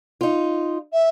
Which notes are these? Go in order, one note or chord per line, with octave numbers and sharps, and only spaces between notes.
D#4 F4
E5